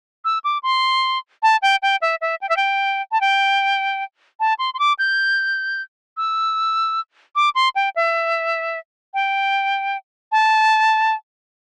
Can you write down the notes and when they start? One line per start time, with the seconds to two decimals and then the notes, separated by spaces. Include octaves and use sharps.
0.25 E6
0.44 D6
0.63 C6
1.43 A5
1.62 G5
1.82 G5
2.02 E5
2.21 E5
2.41 G5
2.49 E5
2.57 G5
3.12 A5
3.21 G5
4.40 A5
4.59 C6
4.74 C6
4.79 D6
4.99 G6
6.17 E6
7.35 D6
7.55 C6
7.75 G5
7.96 E5
9.14 G5
10.32 A5